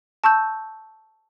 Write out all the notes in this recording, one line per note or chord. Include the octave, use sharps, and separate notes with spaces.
A5 C#6 E6 G6